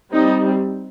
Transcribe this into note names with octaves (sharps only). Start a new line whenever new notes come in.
G3 C4 D#4